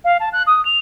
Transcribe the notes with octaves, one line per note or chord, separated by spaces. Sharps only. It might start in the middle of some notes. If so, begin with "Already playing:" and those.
F5
A5
F#6
D#6
F7